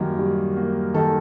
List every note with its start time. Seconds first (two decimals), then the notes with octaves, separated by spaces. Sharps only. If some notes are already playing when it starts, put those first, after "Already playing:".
Already playing: F#2 D#3 G3 A#3
0.19 G3
0.57 A#3
0.94 D#3 A4